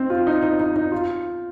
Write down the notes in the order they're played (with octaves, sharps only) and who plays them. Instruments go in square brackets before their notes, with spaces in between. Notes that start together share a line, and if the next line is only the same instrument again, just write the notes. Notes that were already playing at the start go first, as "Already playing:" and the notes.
Already playing: [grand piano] C4 D#4
F4
D#4
D#4
D#4
D#4
F4